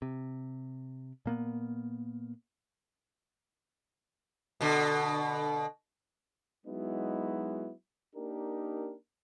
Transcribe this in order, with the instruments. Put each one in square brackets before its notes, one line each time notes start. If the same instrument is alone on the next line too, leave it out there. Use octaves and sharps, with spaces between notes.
[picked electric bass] C3
A#2 A#3 B3
[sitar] B2 D3
[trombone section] F#3 G#3 B3 D#4 E4 F#4
A#3 D4 D#4 G4 A#4